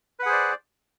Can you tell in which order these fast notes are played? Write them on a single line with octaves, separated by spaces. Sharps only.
B4 F#5 G#4 C5 D5